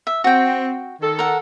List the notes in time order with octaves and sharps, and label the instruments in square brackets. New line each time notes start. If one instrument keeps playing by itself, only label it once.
[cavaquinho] E5
[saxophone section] C4 [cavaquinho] F#4 G5
[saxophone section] D#3 A4
[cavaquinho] A#4 F#5